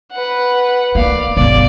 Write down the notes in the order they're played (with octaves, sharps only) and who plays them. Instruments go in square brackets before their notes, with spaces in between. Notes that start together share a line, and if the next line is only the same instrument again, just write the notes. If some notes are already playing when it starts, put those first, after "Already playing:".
[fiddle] B4 F#5
[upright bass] A#3 [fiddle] D5 F5
[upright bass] G1 B2 [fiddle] D5